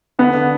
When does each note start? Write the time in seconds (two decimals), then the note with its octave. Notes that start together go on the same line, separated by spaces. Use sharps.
0.19 D3 B3
0.34 D3